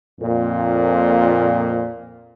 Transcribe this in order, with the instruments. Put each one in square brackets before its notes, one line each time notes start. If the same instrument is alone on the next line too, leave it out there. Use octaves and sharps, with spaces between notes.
[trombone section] F2 A#2